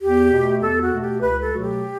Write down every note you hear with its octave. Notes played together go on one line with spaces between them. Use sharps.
E2 G4
B2 A3
E2 A4
F#4
B2 A3
G4
C#2 B4
A4
B2 F#3 A3 F#4
G4